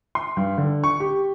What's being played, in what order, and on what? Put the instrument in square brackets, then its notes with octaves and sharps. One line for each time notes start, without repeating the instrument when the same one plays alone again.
[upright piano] C6
G2
D3
C#6
G4